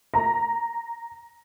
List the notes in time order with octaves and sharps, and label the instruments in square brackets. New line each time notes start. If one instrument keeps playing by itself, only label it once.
[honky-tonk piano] A#5